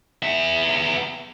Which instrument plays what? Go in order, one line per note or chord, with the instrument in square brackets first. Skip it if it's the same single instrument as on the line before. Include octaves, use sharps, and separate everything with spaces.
[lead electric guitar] B3 E5